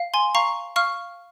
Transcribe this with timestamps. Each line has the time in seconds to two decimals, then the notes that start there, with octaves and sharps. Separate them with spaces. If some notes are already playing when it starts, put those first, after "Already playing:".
Already playing: F5
0.14 G#5 C6
0.35 F5 A#5 C#6
0.76 F5 C#6 F6